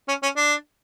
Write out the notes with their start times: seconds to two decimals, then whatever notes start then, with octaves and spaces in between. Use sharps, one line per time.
0.08 C#4
0.23 C#4
0.36 D4